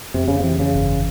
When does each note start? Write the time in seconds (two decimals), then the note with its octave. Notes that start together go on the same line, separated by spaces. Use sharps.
0.14 F2 C3
0.28 C#3
0.40 C3 E3
0.59 C#3
0.74 G1